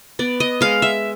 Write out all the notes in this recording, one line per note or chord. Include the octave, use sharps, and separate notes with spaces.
B3 D5
D#5
G#3 F5
E5